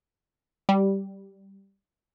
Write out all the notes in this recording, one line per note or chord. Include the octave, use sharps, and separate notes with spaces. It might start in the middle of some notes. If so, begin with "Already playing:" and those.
G3